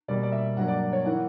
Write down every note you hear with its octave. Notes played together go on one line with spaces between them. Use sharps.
B2 G3 A#3 D5
D5
E5
G2 F#3 A#3 F#5
D5
C#5
E3 A#3 F#5